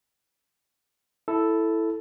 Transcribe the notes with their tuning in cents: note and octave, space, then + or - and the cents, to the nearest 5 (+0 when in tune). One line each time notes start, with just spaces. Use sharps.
E4 +0 A4 +0